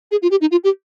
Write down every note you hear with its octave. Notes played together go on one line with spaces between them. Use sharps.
G#4
F4
G4
D#4
F4
G4